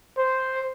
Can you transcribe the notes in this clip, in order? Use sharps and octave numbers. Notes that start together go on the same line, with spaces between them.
C5